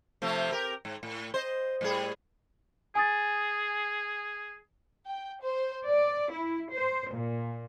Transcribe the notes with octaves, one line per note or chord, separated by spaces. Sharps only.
C3 F3 A3
G4 A#4
G#2
A2
C5 D#5
A2 G3 G#4
G#4 G#5 D#6 A6
G5
C5
D5
E4
C5
A#2